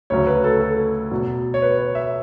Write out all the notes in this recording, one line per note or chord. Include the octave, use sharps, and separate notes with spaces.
D2 C#3 F#3 C#5
B4
A4
A4
E2 B2 F#3
C#5
B4
C#5
E5